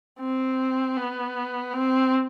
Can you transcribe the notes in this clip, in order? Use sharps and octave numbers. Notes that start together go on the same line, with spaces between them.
C4
B3
C4